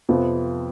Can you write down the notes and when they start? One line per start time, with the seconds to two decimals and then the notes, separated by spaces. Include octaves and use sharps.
0.09 F2 C3 F3 B3 F4